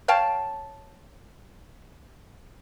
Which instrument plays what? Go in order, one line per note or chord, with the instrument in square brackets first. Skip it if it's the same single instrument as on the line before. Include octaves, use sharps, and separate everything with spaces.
[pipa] C#5 F5 G5 A5